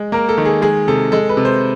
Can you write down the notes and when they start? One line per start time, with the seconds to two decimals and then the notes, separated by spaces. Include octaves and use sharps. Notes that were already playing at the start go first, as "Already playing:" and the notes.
Already playing: G#3
0.12 A#3 A#4
0.29 A4
0.38 D#3
0.45 G#4
0.62 G#3 G#4
0.88 C3 A4
1.12 G#3 A4
1.29 B4
1.37 C3
1.45 C5